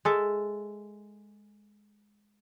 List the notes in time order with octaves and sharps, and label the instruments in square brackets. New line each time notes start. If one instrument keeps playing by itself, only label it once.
[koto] G#3 A4 E5